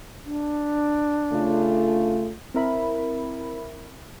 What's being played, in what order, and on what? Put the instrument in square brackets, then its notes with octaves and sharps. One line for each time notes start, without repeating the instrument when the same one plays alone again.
[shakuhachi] D4
[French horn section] C#3 A3 F4
[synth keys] C4 E4 A#4 E5 B5